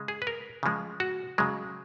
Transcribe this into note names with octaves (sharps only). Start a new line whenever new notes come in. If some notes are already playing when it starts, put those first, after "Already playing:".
Already playing: C#3 G#3
G#4
B4
A#4
C#3 F3 G#3
F#4
C#3 F#3 G#3